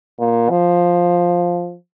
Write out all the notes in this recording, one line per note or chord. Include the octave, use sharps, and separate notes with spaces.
A#2
F3